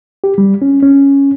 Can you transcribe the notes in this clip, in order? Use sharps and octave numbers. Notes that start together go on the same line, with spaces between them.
G4
G3
C#4
C#4